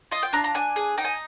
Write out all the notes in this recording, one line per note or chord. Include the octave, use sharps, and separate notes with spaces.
F4 D#5
G5
D4 A#5
A#5
D4 G#5
G#4
D#4 G5
G#5